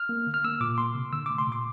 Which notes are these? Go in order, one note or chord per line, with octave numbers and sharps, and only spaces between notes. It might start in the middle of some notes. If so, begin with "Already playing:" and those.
Already playing: F6
A#3
D3
F6
A#3 E6
A#2 D6
A#3 C6
C3
D3 E6
A3 D6
C6
A#2
D6